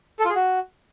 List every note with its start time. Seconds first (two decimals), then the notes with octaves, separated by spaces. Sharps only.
0.20 A4
0.25 F4
0.30 G#4
0.35 F#4